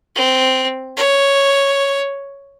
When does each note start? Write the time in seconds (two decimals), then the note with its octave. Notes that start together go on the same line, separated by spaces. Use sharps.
0.16 C4
0.97 C#5